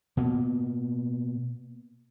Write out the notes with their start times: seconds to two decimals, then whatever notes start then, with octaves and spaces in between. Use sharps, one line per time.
0.17 B2 A#3